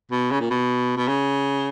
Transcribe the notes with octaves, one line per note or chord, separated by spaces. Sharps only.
B2
C#3
A#2
B2
B2
C#3